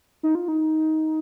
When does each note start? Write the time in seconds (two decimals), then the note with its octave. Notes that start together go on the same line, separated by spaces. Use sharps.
0.23 D#4
0.35 F4
0.48 D#4